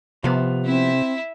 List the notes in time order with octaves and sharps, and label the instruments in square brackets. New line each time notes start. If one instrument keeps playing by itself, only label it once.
[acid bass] C3 [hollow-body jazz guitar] F3 B3
[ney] C4 [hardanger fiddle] E4 E5